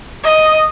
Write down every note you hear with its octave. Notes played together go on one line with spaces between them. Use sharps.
D#5